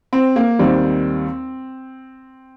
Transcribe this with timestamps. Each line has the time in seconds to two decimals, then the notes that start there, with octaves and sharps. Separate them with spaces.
0.13 C4
0.36 A#3
0.59 D#2 D#3 G3 C4